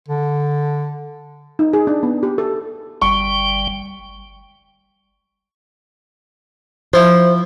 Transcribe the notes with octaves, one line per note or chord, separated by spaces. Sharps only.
D3
D#4
G#4
D4
B3
G4
A4
G1 G3 G5 C#6
F3 E4 C5